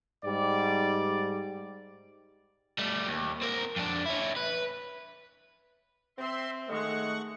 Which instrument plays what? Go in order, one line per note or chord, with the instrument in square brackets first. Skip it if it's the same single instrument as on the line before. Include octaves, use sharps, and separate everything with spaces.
[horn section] G#2 G3 D5
[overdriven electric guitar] G3 A3
D#2
C4 A#4
F2 D4
C#4 E4
B4
[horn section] C4 [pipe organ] E5 C6
[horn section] D#3 G#3 [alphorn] A3 [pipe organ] F#5 C#6